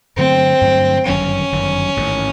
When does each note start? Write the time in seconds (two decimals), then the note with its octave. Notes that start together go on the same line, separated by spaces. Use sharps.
0.16 G2 D3 F#3 A3 C4
0.61 G2 D3 F#3 A3
1.06 G1 F#2 D#3 F#3 C#4
1.52 G1 F#2 D#3 F#3
1.97 A1 G#2 D#3